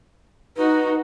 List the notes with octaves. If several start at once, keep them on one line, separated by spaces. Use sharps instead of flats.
D#4 F#4 B4